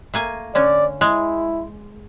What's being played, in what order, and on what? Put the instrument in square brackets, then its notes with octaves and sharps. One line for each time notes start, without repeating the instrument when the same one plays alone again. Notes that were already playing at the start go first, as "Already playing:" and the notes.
[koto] A3 A#3 G#5
[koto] D3 C#4 [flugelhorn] D5
[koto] G#3 [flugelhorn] E4